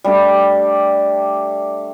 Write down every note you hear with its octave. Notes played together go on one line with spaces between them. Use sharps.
G3 A3 D4 G4